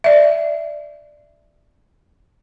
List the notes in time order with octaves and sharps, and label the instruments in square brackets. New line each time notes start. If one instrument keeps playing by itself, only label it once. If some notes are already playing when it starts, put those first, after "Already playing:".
[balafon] D5 E5